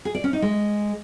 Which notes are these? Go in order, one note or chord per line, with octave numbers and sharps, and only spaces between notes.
G#4
D5
C#4
D#4
G#3